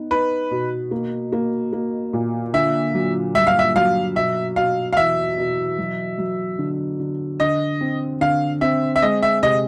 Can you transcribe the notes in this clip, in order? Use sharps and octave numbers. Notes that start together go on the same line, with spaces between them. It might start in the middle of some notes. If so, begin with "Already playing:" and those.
Already playing: B3 D#4
D#4 B4
B2
A#3
A#3
A#3
A#2
D3 E5
F#3
G2 E5
F5
E5
F#3 F5
B2 E5
B2 F5
F5
E2 E5
B2
F#3
F#3
D3
D3
D3 D#5
C4
D3 F5
C4 E5
E5
G#3 D#5
E5
C3 D#5